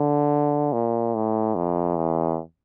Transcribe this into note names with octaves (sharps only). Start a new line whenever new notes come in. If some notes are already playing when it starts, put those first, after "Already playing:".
Already playing: D3
A#2
A2
F2
E2